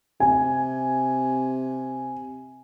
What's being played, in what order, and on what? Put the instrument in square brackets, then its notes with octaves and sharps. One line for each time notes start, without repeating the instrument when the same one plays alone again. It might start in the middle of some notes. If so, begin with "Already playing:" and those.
[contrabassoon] C3 [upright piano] G#5